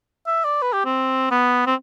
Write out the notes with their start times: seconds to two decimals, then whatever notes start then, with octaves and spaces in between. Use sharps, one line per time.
0.27 E5
0.45 D5
0.62 B4
0.73 G4
0.85 C4
1.31 B3
1.67 C4